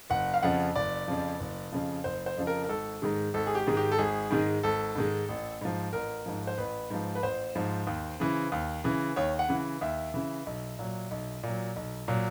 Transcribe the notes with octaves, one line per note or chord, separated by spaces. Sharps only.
F#1 F#5
F5
F2 C#3 F3 F#5
F#1 D5
F2 C#3 F3
F#1
F2 C#3 F3
F#1 C5
C5
F2 C#3 F3
A#4
A#4
G#1 A4
G#2 D#3 G#3
G#1 A4
G#4
G4
G#2 D#3 G#3
G4
A4
G#1 G#4
G#2 D#3 G#3
G#1 A4
G#2 D#3 G#3
A1
G#2 F3
A1 A#4
G#2 F3
C5
A1 B4
G#2 F3
B4
A1 C5
G#2 F3
D#2
C#3 E3
D#2
C#3 E3
D#2 C#5
F#5
C#3 E3
D#2 E5
C#3 E3
B1
A#2 F#3
B1
A#2 F#3
B1
A#2 F#3